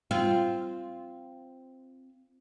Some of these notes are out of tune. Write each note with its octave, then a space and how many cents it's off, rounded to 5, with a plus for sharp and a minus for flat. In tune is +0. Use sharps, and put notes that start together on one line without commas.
C4 +0 F4 -15